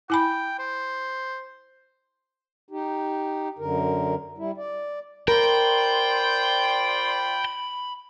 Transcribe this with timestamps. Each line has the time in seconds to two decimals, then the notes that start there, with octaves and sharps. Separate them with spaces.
0.10 E4 G5 G#5 B5
0.59 C5
2.71 D#4 G4
3.59 F#2 D3 A#4
4.38 G3 E4
4.57 D5
5.28 F4 A#4 C5 D5 G5 B5